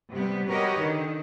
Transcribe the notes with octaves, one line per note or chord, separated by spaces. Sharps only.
C3 G3 B3
F#4 G4 A#4 B4 C#5 D#5
D3 D#3